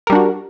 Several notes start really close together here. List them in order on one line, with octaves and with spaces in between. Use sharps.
A#4 G3 D4 F#4